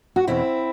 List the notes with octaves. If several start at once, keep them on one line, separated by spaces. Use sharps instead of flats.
F#4
E2 B2 C4 E4